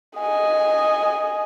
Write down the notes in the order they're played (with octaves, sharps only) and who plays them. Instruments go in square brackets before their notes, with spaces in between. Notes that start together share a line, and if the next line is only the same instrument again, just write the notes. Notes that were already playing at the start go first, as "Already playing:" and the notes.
[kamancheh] D#5 G#5